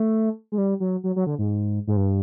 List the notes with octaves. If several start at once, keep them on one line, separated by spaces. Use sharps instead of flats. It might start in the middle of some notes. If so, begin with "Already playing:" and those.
Already playing: A3
G#3
G3
F#3
F#3
F#3
D3
G#2
G#2
G2